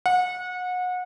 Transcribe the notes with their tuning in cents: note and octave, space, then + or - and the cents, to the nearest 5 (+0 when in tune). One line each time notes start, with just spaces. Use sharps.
F#5 -30